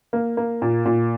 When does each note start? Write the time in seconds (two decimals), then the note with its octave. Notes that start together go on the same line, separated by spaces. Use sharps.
0.13 A#3
0.37 A#3
0.62 A#2
0.85 A#2